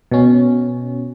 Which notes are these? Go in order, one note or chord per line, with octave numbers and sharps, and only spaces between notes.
B2 C#4